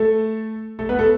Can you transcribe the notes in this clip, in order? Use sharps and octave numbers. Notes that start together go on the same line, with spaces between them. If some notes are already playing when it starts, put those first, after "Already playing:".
Already playing: A3 A4
A3 A4
B3 B4
A3 A4